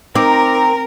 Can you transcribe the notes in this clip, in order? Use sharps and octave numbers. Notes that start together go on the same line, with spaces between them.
C4 D#4 A#4 A#5 D6